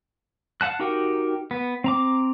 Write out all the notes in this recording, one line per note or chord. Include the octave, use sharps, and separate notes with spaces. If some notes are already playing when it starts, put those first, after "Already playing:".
F5 F#5 A5 F#6
D#4 F#4 G4 A#4 G5
B3
C4 A#5 D6